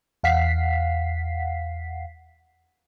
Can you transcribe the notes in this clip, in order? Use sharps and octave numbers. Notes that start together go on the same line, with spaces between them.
E2 F5 F#5 B6 C7